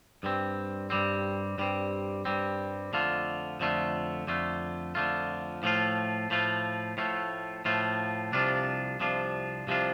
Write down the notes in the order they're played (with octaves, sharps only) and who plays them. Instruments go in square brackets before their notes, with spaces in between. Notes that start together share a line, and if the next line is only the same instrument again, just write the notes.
[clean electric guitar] G2 G3 C4
G2 G3 C4
G2 G3 C4
G2 G3 C4
F2 D3 A3 F4
F2 D3 A3 F4
F2 D3 A3 F4
F2 D3 A3 F4
A2 F3 A3 F4
A2 F3 A3 F4
A2 F3 A3 F4
A2 F3 A3 F4
C2 C3 F3 D4 F4
C2 C3 F3 D4 F4
C2 C3 F3 D4 F4